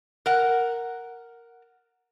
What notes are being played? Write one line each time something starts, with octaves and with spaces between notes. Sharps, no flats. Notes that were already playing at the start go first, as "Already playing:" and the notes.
A#4 F#5